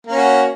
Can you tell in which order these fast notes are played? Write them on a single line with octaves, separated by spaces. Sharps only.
A#3 C#4 F#4